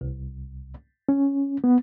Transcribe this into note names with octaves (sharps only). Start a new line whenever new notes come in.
C2
C#4
B3